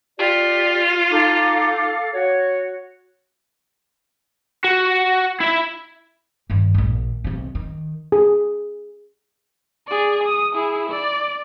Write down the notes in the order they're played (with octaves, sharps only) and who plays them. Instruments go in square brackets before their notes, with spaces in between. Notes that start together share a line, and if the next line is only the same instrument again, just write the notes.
[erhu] F4 [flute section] G4 D5
[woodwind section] D#4 [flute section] A4 F5 D6
[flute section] F#4 [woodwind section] C#5
[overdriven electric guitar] F#4
E4 E5
[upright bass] G2 D#3
A#1 D3
B1 C3
D#3
[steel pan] G#4
[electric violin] G#4 D5
D#6
E4 G#4
D5